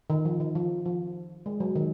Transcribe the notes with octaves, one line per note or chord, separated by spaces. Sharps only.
D#3
F3
D#3
F3
F3
G#3
F#3
D#3